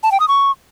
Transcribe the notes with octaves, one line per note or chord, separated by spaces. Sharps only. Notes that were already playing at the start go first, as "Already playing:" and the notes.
A5
G5
D#6
C#6